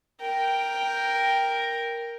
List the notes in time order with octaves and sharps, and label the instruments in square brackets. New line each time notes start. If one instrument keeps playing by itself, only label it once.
[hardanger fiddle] A#4 G5